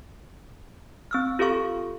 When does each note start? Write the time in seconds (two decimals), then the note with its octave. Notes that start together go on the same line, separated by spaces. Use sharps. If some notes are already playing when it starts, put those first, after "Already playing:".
1.11 C4 E6 F6
1.39 F4 G4 A4 F5 C#6